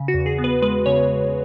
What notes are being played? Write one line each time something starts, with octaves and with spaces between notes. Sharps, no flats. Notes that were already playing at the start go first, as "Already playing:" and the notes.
Already playing: C#3
F#4
E2
G#4
B3
B4
G#3 B4
C#3 C#5